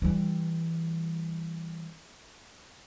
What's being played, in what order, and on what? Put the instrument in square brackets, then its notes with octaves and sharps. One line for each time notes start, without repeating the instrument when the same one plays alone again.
[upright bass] E3 G3